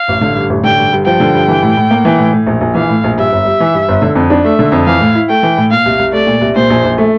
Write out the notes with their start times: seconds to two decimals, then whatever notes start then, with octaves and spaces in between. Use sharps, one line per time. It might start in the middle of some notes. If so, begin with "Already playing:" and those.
Already playing: F5
0.08 A1
0.21 D3
0.35 G2
0.49 A1
0.64 D3 G5
0.79 G2
0.93 G2
1.06 F3 G5
1.20 D3
1.34 G2
1.48 E3
1.63 A2
1.77 A2
1.91 A#3
2.05 E3
2.19 A2
2.33 A2
2.46 A#1
2.61 A#1
2.75 E3 F5
2.89 A2
3.04 A#1
3.18 G2 E5
3.32 G1
3.45 G3
3.60 E3
3.74 G2
3.88 G1
4.02 D3
4.15 F2
4.30 D4
4.44 A3 E5
4.59 D3
4.72 F2
4.86 E3 F5
5.01 A2
5.15 E4
5.29 A3 G5
5.43 E3
5.57 A2
5.70 A#2 F5
5.86 C2
5.99 C2
6.13 A3 D5
6.27 A#2
6.41 C2
6.55 A#2 C5
6.70 A#1
6.84 A#1
6.98 A3